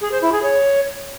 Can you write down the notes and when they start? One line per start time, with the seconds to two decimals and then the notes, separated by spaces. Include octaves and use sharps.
0.01 G#4
0.11 C5
0.22 E4
0.32 G#4
0.42 C#5